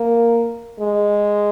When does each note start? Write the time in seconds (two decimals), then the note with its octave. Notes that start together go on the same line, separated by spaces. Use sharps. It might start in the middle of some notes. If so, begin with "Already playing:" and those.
Already playing: A#3
0.80 G#3